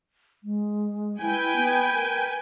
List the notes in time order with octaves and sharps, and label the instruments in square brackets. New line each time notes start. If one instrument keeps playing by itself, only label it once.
[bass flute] G#3
[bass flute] E4 [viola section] B4 G5 G#5
[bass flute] B3
A#4